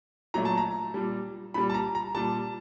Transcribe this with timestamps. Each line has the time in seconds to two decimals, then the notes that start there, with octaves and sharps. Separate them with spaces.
0.34 A#2 F#3 A3 A#5
0.45 A5
0.57 A#5
0.94 A#2 G3
1.54 A#2 G3 B5
1.70 A5
1.74 A#5
1.95 A#5
2.15 A#2 G3 A5